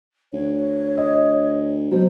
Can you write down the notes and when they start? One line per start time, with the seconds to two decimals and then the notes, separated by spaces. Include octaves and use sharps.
0.33 D2 C#5
0.97 D#5
1.91 B2 F#3 C5